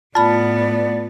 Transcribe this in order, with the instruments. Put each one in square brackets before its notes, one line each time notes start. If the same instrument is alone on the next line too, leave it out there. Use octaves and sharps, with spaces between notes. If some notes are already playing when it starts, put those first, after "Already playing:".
[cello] A2 B3 [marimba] F4 B5 [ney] D5 [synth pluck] A5